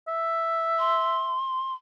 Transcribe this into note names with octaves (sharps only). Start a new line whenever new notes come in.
E5
C6